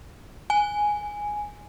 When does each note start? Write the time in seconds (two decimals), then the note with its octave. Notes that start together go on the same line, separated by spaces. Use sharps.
0.50 G#5